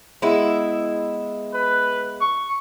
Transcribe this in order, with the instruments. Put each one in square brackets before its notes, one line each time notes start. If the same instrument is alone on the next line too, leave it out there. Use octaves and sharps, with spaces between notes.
[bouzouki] G#3 B3 E4
[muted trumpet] B4
C#6